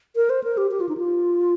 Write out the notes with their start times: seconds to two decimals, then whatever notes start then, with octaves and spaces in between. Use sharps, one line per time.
0.16 A#4
0.30 C5
0.44 A#4
0.57 G4
0.71 G4
0.80 F4
0.89 D#4
0.97 F4